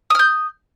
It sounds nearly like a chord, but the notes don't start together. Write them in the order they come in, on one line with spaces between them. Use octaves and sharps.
D#6 F6 G6